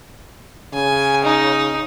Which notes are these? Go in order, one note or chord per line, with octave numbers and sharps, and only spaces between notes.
C#3 G#5
D#4